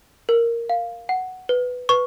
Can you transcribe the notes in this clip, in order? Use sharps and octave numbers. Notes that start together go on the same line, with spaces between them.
A#4
F5
F#5
B4
B4 C#6